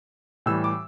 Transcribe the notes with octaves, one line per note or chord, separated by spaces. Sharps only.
A2 E3 G3 E6
D6